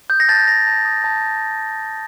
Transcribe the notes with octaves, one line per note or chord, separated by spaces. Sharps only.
D#6 G6
A#6
A5 A6
G6 A#6
A5
D#6
A5